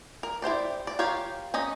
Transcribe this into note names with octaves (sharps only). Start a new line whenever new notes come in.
A#4
E4 G4 C5 D5
D5
F4 G4 A#4 C#5 F5
C#4 D#4 D#5